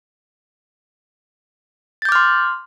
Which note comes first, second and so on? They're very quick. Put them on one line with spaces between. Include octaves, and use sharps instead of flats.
A6 G6 D6 F6 C6